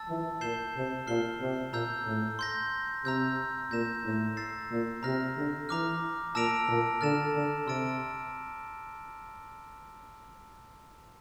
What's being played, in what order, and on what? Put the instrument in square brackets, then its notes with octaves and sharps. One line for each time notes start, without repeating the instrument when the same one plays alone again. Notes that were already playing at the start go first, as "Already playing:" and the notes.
Already playing: [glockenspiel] A5 E6 A6
[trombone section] E3
[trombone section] A#2 [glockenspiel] G6 C7 E7 G7
[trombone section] C3
[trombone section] A#2 [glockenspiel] F6 C7 G7
[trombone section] C3
[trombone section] A#2 [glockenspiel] A#5 E6 G6
[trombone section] A2
[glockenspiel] C6 G6 A#6
[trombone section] C3 [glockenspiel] A#5 E6 G6
[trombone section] A#2 [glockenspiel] G6 A#6 E7
[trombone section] A2
[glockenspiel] E6 A6 C7
[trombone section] A#2
[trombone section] C3 [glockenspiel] A#5 F6 A#6
[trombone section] D3
[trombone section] E3 [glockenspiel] A#5 D6 F6
[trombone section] A#2 [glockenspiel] A5 E6 A#6 D7 F7
[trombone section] A#2
[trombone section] D3 [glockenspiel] F6 A6 E7
[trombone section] D3
[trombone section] C3 [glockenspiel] C6 E6 A6 D7